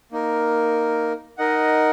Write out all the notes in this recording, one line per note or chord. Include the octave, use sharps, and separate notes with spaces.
A#3 D#4 A#4
D#4 A#4 D#5 F#5